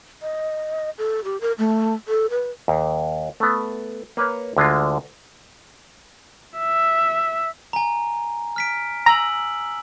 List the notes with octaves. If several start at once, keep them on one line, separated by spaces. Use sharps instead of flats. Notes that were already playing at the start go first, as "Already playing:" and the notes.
D#5
A4
G4
A#4
A3
A4
B4
D#2
A3 B3
A#3 B4 C#5
D2 D3 G#3 F4
E5
G#5 A#5
F6 B6 D7
G#5 A#5 E6 F#7